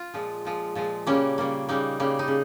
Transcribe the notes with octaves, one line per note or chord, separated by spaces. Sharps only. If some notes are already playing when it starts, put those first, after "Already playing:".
Already playing: F4
A#2 F3 G#3
A#2 F3 G#3
A#2 F3 G#3
C#3 G3 A#3 C#4
C#3 G3 A#3
C#3 G3 A#3 D#4
C#3 G3 A#3
D#4
C#3